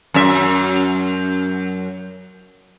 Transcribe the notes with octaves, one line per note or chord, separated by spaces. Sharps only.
F#2 E5